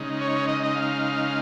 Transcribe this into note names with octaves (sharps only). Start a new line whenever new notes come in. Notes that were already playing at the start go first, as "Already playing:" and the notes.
Already playing: C#3 G#3 D#4
C#5
D#5
D#5
F5